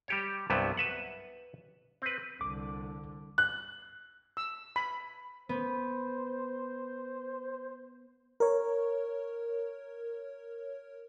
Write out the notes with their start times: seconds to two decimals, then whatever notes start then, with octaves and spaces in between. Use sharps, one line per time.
0.08 G3 G4 C#5
0.50 C2 G2 C3 F#3 G3 B3
0.77 B4 E5 F#5
2.02 C4 B4
2.41 C2 D3 D6
3.38 F#6
4.37 E6
4.76 B5
5.49 B3 C5
8.40 A#4 C#5